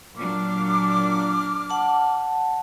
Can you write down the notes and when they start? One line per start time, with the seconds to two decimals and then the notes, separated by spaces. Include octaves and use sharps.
0.16 A#2 F#3 D4 D6 F6
1.69 F#5 A5